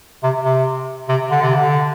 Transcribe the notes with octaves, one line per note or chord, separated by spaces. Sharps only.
C3
C3
C3
D3
C3
D3